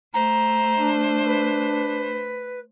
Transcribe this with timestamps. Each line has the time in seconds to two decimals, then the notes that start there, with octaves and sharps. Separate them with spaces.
0.13 A3 C5 A#5
0.79 D4
1.26 B4